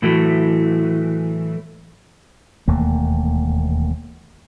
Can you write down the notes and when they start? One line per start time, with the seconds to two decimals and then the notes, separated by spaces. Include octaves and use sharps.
0.02 A2 E3 F#3 A3
2.68 E1 D#2 A3 A#3